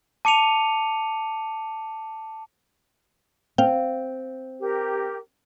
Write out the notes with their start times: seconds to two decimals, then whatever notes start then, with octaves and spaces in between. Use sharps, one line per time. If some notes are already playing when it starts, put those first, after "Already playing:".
0.25 A5 D6 C#7 D#7 F7
3.58 C4 F5 G5
4.60 G4 A#4